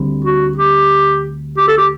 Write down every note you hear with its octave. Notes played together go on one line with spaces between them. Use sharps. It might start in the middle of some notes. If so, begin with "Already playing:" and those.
Already playing: D2 D3 G3 C4
F#4
G4
G4
A4
G4